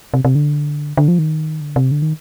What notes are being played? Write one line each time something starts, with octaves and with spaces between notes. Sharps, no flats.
C3
C3
D3
D3
F3
D#3
D3
C3
D3
D#3